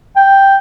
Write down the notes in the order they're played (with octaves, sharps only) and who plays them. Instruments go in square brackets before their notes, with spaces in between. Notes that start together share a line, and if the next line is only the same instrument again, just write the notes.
[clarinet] G5